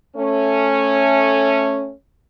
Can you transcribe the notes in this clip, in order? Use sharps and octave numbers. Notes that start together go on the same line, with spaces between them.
A3 C#4